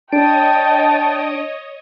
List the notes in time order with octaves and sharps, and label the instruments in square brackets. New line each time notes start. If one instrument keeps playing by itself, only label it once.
[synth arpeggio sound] D4 D7 [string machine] C#5 D#5 D#6 [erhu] G5 [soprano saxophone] A5